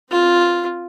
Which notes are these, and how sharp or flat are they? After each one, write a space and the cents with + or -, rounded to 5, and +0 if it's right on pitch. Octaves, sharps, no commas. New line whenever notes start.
C4 +10 F4 +0